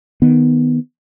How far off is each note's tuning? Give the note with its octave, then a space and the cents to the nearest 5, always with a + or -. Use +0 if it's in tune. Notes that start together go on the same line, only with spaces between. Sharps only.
D#3 +0 B3 +0